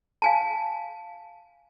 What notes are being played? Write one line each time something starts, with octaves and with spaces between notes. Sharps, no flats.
F5 G#5 A5